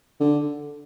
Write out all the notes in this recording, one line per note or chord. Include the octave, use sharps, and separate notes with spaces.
D3